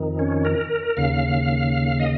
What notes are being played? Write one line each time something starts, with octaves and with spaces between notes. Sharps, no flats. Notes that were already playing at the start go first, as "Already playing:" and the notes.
Already playing: F2 D#3
C#4
A#4
D#2 C#3 F5
D#5